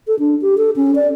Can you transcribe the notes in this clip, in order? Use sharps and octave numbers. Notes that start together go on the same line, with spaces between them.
A4
D4
G4
A4
C#4
D5